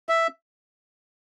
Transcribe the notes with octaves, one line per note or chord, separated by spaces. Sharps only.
E5